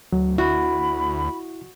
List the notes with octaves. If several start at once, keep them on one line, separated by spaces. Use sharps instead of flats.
D2 F#3
E4 F#4 B5